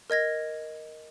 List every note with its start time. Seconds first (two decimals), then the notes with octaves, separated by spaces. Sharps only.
0.10 A#4 D#5 G#6 A#6